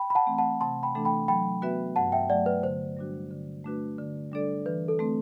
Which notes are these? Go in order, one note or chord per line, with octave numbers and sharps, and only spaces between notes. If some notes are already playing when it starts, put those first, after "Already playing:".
Already playing: G5 B5
B5
F#5 A5
E3 A3 C4
F#5 A5
C3 A5 C6
G5 B5
E3 A3 D4 A4
G5 B5
F#3 G5 B5
B3 F#4 B4 E5
G2 F#5 A5
E5 G5
F#3 A3 D5 F#5
B4 D5
D3 C5
G3 D4 F#4
D3
A3 D4 F#4 B4
D3
G3 D4 A4 D5
E3 B4
A4
A3 C4